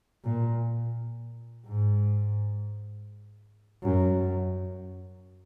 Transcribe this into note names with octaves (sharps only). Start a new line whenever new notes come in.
A#2
G#2
F#2